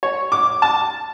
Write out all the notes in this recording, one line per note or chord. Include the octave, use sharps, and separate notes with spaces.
C#5
D6
A5